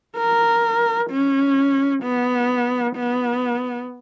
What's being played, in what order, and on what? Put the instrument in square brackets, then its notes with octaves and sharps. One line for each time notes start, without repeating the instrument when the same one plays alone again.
[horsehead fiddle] A#4
C#4
B3
B3